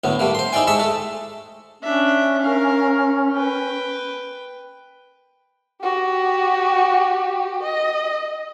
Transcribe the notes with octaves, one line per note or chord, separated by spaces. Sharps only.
D2 A2 B3
G3 A3 A#3
C5 C6
D#4 E4 D5 G5 G#5
G#3 D#5 E5 A5 C#6
A3 A4
C#4 D4 E5
A#4 F5
B4 G5
F#4 G4
D#5